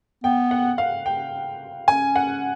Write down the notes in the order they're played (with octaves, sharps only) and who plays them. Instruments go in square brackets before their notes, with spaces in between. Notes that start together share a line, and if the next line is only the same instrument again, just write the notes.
[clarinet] B3 [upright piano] G5
[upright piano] F#5
F5
G5
[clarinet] C#4 [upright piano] G#5
[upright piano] F#5